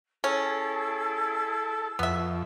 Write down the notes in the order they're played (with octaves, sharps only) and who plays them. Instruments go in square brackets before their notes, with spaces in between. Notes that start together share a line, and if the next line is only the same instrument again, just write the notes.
[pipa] C#4 [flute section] E4 G#4 E6 [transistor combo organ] A4
[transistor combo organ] F2 [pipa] B3 E5